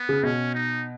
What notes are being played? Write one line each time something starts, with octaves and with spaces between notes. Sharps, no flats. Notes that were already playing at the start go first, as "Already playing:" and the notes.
Already playing: B3
C#3
B2 C#4
D#4